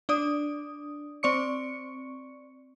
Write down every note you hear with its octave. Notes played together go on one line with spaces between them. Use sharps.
D4 D5 D#6
C4 D5 C#6 C#7